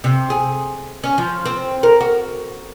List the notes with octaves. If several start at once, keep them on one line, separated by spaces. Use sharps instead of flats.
C3
G#4
C#4
F3
C4
A#4
F#4